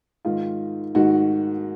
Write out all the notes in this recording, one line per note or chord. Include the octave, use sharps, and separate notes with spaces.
G#2 D#3 F4
G#2 D#3 F#4